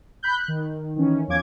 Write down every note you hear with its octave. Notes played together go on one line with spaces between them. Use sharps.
B5 F#6 G6
F#6
D#3
D#3 E3 C#4
E2 F3 C#4 F4 D6 G#6